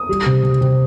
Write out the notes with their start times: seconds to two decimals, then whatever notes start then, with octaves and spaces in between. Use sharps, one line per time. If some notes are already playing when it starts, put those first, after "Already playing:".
Already playing: D#6
0.09 G3
0.26 C3
0.43 C3
0.61 C3